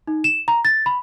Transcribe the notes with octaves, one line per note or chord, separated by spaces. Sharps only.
D#4
E7
A#5
A6
B5